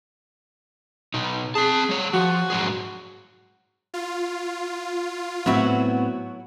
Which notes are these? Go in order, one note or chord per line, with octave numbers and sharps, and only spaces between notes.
B2 D#4
C4 G#4 A5
G3 C#5
F3 F#4
G#2 F#3 G#4
F4
A2 F#3 B3 C4 E4 F#4